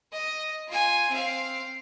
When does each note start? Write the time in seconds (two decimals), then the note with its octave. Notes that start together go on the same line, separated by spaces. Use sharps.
0.12 D#5
0.68 F4 G#5
1.10 C4 F5